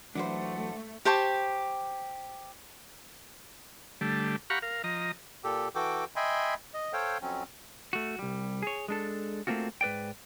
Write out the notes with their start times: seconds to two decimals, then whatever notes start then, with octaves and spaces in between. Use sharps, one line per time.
0.15 E3 F#3 A3 D4 B4 C5 F#5
1.05 G4 C5 A5 C#6
4.01 D3 G3 A3
4.50 G4 F5 F#5 A#5 B5 C#6
4.62 A#4 F5
4.84 F3 D#5 A#5
5.44 A#2 G4 A4
5.75 E3 F#4 A4 G5 D6
6.16 D#5 E5 G5 G#5 B5 C6
6.74 D#5
6.93 A4 C5 C#5 F5 G5
7.22 F2 F#3 C4 C#4
7.93 A3 F#4
8.19 C2 G3
8.63 G#4 C#5
8.88 G#3 D4 A4
9.47 A3 A#3 C4 F4 F#4
9.81 G#2 B4 D5 G5